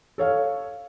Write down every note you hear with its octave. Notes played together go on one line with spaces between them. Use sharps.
A4 C#5 F5